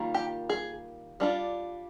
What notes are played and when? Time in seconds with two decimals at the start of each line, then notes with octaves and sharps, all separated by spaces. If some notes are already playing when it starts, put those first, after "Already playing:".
Already playing: D#3 G3 A#3 F4
0.14 G4
0.49 G#4
1.20 G3 D4 F4